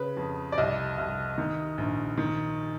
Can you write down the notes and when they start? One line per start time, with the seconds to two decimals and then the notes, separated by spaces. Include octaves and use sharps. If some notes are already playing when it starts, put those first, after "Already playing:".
Already playing: C#3 B4
0.17 F2
0.52 D5
0.58 C2 D#5
0.98 C2
1.38 D#3
1.78 A#1
2.18 D#3